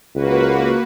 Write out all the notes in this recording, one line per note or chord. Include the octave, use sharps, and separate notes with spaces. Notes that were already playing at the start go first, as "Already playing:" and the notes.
C#2 A#3 F#4 B4